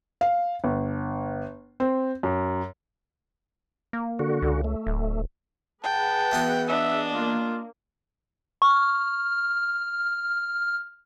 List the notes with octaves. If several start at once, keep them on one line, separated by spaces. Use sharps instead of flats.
F5
G1
C4
F#2
A#3
D3 F#4
C#2
A3
D1
G#4 B4 F#5 G5 A5
E3 B3 F#4
D4 D#5 E5
A#3 F4
C#6 F6